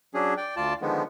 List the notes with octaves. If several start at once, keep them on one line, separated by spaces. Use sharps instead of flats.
F#3 C#4 D4 G#4
D5 G5
D2 F4 D5 A5
D3 D#3 F3 G#3 B3